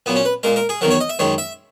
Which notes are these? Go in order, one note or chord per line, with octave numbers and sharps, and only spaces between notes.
A#2 F#3 B3
C#4
B4
A#2 G#3 A#4
A#4
G#4
E2 D#3 F#3 A#4
C#5
D#5
E5
F#2 D#3 G#3 C#5
E5